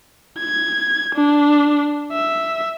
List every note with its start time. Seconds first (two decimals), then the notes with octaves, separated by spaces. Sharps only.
0.38 G#6
1.15 D4
2.13 E5